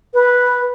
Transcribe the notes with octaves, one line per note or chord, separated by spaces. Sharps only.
B4